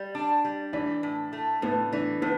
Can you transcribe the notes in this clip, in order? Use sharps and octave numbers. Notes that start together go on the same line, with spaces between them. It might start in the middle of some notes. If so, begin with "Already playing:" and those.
Already playing: G3
D4
G3
E3 D4
A2
A3
A2 B3
E3 D4
A2 B3